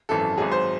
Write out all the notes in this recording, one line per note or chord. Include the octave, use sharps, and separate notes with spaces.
G#1 F#2 E3 A4
G#1 G#2 F#3 G#4
C5